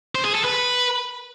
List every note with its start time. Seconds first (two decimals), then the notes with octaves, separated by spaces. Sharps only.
0.15 C5
0.25 G#4
0.34 A4
0.44 B4